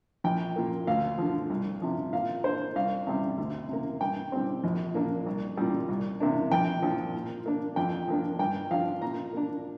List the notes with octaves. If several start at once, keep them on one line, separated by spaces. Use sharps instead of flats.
A#1 G5
A#2 A#3
D2 F5
D3 F3
C2
C3 F3
A#2 F5
A#3 D4 C5
C2 F5
C3 G3
D2
C3 A#3
G2 G5
G3 C4
A#1
A#2 A#3 D4
C2
A#2 G3
C2
C3 A#3 D4
A#1 G5
A#2 F3 D4
A#2
A#3 D4
F2 G5
F3 A#3 D4
G2 G5
F3 D4 F5
A#2 A#5
A#3 D4